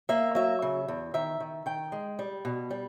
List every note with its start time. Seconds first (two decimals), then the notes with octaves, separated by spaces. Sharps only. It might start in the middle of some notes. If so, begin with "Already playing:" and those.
0.09 A#3 E5
0.35 F#3 E5
0.62 C#3
0.88 E2
1.14 D#3 E5
1.40 D#3
1.66 D#3 G5
1.92 G#3
2.19 G3
2.45 B2
2.71 G3